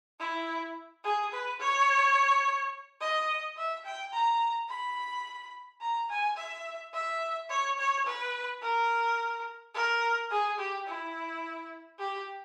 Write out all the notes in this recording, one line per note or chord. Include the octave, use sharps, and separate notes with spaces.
E4
G#4
B4
C#5
D#5
E5
G5
A#5
B5
A#5
G#5
E5
E5
C#5
C#5
B4
A#4
A#4
G#4
G4
E4
G4